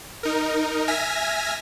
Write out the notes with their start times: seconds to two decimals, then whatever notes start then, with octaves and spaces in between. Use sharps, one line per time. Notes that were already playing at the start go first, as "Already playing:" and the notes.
0.23 D#4 A#4
0.88 E5 G#5 F6 G#6 A#6 B6